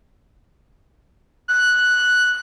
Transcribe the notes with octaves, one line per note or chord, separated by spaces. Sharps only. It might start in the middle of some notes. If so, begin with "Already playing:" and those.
F#6